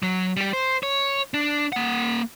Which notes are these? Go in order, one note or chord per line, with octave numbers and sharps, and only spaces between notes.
F#3
G3 G4
C5
C#5
D4
A#3 F#5